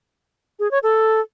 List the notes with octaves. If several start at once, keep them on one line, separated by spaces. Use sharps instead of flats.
G#4
C#5
A4